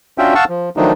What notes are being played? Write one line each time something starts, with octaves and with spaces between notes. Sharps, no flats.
C#4 D4 F4 F#4 E5 G5
F5 F#5 A5 C#6 E6
F3
D#3 F3 F#3 A3 D4 D#4